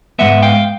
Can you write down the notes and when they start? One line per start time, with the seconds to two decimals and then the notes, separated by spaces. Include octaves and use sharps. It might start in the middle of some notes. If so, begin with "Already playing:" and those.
0.19 G#2 F3 G#3 B3 E5 F#5
0.42 F5 G5